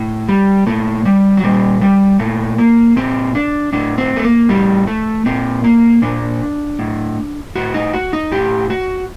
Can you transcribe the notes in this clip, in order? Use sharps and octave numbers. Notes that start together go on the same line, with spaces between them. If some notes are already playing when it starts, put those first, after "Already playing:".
Already playing: A2
G3
A#2 A3
G3
F#3
A#2 G3
G3
A#2 A3
A#3
A#2 C4
D4
A2 D4
C4
A3
A#3
A2 G3
A3
A#2 C4
A#3
A#2 D4
A2
A2 F#4
D#4
F#4
D#4
A2 G4
F#4